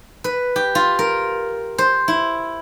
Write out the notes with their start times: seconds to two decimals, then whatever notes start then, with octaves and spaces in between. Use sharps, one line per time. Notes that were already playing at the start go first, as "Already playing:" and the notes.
0.24 B4
0.56 G4
0.75 F4
0.99 A#4
1.78 C5
2.08 E4